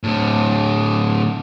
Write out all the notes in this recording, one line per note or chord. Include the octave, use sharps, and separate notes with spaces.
A2 D3